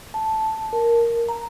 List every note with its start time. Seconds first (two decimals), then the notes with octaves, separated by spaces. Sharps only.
0.14 A5
0.73 A#4
1.29 A#5